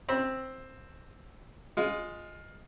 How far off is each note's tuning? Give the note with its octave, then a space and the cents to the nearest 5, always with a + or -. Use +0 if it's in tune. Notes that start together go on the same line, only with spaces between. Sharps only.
C4 +5 B5 -30
G#3 +0 F4 +15